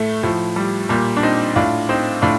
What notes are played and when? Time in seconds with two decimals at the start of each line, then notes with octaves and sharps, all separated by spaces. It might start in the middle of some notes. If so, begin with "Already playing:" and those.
Already playing: A2 A3
0.23 A2 F3
0.56 G3
0.89 A#2 G3
1.17 D4
1.23 C4 D#4
1.56 A2 D4 F4
1.89 C4 D#4
2.22 A2 D4 F4